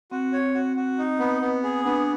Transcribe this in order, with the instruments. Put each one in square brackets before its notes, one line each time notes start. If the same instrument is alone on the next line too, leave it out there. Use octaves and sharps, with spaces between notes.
[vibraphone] C4 [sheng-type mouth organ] F#4
[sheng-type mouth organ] C#5
F#4
F#4
D#4
B3
B3
G#4
[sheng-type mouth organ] B3 [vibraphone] D4